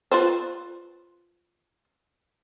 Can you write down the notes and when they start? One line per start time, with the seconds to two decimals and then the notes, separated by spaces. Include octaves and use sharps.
0.11 F4 B4 C5